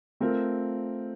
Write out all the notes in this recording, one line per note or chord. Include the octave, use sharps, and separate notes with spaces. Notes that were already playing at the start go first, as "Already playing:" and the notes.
A3 C4 F4 A#4